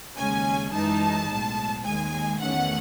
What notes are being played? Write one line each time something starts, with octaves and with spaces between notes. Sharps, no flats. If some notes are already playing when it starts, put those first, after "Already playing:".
D#2 C#3 G#3 C#4 G#5
F#2 E3 G#3 D#4 A5
B1 A2 G#3
D#2 D#3 G#3 G#5
E2 D#3 A3 C#4 F#5